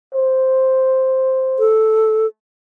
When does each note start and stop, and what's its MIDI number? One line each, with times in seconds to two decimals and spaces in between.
0.14 1.73 72
1.59 2.26 69